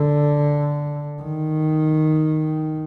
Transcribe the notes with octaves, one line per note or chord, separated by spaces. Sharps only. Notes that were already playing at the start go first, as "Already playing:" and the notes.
Already playing: D3
D#3